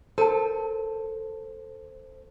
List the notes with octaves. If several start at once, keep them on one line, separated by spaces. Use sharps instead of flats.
A4 A#4 C5 A5